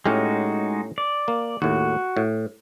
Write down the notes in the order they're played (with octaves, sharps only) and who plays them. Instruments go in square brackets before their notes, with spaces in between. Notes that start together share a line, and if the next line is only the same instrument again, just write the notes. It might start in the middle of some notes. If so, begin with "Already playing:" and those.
[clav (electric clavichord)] A2 C#4 G4 [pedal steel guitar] G#3 D#4 F#4
[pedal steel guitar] D5
[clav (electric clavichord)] A#3
[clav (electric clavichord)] D#2 A2 [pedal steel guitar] F#4
[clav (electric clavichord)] A2